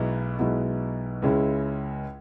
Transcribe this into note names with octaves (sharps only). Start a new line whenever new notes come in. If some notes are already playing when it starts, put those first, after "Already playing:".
Already playing: B1 B2 G#3 B3 E4
B1 B2 G#3 B3 E4
C#2 C#3 G#3 C#4 E4